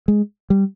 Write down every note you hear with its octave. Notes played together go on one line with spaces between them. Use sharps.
G#3
G3